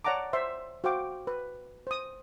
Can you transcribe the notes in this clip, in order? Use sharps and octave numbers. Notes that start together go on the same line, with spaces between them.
C#5 D5 F#5 A5 A#5 D6
C5 E5 C6
F#4 C5 F5 G5 D6
B4
C5 D#6